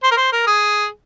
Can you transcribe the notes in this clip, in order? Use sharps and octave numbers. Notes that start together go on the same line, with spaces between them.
C5
A#4
C5
A#4
G#4